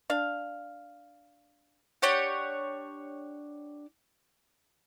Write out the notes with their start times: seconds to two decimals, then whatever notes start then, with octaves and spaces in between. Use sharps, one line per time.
0.10 D4 F5
2.02 D4 G4 C#5 F#5